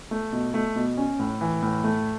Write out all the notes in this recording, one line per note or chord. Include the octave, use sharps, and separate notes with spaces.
A3
B2
A3
B2
C#4
A2
E3
A2
A3